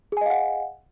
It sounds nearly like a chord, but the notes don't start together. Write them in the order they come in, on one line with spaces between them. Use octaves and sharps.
G#4 G#5 D#5 F5 F#5